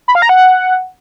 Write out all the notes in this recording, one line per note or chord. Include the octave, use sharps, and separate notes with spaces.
B5
F5
A#5
F#5